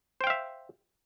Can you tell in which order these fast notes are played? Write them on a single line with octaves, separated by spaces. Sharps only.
C5 G5 F5 E5